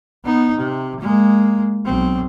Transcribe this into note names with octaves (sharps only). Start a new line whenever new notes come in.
B3 D#4
C3
G#3 A#3
B1 C4